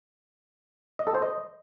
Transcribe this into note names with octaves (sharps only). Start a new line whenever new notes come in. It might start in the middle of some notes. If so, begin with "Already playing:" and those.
D#5
A4
C5
D#5